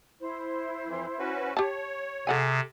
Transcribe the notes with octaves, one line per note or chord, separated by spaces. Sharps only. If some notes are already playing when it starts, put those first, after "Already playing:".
E4 C5
F2 E3
C#4 F#4 B4
G4 C#5 A5
C3 G#4 A4 F#5 G#5